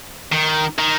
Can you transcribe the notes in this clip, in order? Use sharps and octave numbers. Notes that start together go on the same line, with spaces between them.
D#3
D#3